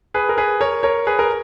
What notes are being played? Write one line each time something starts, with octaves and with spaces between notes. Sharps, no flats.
G#4 B4
A#4
G#4 B4
A#4 C#5
A#4 C#5
G#4 B4
A#4